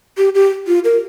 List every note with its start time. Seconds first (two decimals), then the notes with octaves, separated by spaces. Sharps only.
0.18 G4
0.35 G4
0.68 F4
0.84 A#4